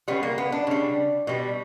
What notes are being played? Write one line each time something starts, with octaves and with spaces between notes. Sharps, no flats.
C#3 G3 B3
A#3
B3
D4
C#3 G3
B2 G3